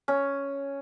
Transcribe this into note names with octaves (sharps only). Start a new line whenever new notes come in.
C#4